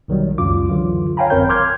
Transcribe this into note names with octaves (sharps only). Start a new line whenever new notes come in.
B1 D#3 F#3 G3
C#2 F#2 F4 D6
D3 E3 F#3 F4
C#5 F5 G5 G#5 A#5 B5
G#1 F#2 C4 A#4 C#5 G6
C6 D6 F6 G6 G#6